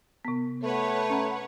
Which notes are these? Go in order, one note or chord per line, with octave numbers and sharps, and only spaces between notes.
C3 B3
A3 B4 C#5 F#5
C#4 A#5